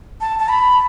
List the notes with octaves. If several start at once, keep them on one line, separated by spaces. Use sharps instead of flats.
A5
A5
B5